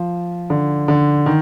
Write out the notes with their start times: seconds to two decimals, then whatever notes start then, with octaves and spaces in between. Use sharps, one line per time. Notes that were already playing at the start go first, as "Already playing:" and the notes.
Already playing: F3
0.50 D3
0.88 D3
1.26 D#3